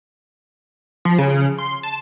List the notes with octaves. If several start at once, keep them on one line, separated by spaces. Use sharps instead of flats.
F3
C#3
C6
A5